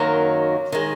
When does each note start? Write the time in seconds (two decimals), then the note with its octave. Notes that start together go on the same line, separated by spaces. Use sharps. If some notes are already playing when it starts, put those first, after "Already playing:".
Already playing: F#2 D#3 F#3 A#3
0.72 D#3 G#3